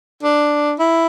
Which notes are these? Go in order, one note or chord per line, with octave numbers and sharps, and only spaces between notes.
D4
E4